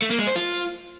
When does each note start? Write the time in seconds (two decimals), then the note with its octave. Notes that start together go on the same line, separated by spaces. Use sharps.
0.02 A3
0.10 A#3
0.19 G#3
0.27 C5
0.36 F4